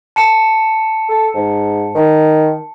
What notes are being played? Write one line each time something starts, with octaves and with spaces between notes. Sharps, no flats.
A5 C#7 E7
A4
G#2
D#3